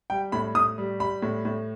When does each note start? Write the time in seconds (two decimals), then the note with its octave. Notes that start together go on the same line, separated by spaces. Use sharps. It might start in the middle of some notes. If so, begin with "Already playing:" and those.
0.10 G3 G5
0.32 A2 B5
0.55 A2 D#6
0.78 G3
1.00 G3 B5
1.22 A2
1.45 A2